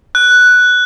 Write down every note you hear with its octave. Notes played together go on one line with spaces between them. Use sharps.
F#6